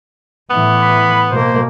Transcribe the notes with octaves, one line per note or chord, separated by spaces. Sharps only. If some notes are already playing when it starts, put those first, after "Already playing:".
A2 E3 B3
B5
B2 A#3 C5